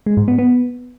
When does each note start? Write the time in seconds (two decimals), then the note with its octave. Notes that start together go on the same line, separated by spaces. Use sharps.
0.06 G#3
0.17 G#2
0.28 B3
0.38 B3